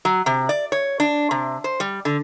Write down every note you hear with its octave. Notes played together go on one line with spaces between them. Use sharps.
F#3
C3
D5
C#5
D4
C3
C5
G3
D3